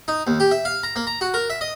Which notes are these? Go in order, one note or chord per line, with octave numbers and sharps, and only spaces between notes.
D#4
D#2
G4
E5
F5
A#5
A#3
A#5
F#4
A#4
E5
D#5